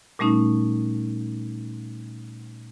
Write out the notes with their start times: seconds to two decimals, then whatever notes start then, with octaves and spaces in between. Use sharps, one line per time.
0.19 A#2 G3 A3 C#4 D#4